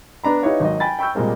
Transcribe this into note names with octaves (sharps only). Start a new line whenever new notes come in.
B3 D4 A#5 B5
D#4 E4 G4 B4 C#5 F5
G#1 F#3 D#5
G5 G#5 B5 A6
G5 B5 C#6 E6 G6
A#2 G3 G#3 A#3 C4